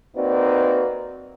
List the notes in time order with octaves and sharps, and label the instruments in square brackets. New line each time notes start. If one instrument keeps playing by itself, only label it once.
[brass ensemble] A#3 C4 D#4 F#4 B4 D5